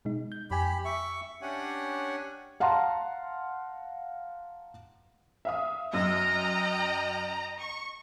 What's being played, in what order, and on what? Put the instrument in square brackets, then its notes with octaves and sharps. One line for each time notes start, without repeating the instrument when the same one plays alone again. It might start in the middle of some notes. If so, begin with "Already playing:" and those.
[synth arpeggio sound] B2 G#3 D#4
G6
[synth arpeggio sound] F2 G#5 [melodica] G4 B5
[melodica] E5 C#6
[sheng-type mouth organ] C#4 D4 G4 C#5 F#5 G#5
[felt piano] F5 F#5 A5 A#5 C6
[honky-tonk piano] E5 F5 D#6
[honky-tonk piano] F#2 E6 [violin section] D#5 G5 A#5
[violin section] C#6